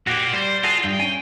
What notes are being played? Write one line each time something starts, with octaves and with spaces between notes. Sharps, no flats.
A#2 A#3 F#4 G4
G3 C5
F4 F#4 G#4 A4
G2 G5
C#4 G#5